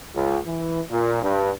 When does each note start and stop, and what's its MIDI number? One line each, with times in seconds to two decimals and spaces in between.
0.16 0.39 37
0.47 0.82 52
0.91 1.19 46
1.22 1.51 43